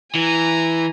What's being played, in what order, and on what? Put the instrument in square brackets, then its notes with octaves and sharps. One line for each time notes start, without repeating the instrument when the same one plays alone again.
[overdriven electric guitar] E3 [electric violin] G#5 A#5